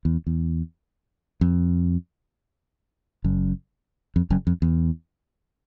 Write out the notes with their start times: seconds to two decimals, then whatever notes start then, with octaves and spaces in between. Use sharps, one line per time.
0.05 E2
0.27 E2
1.41 F2
3.24 F#1 F#2
4.16 F2
4.30 F#1 F#2
4.47 F2
4.62 E2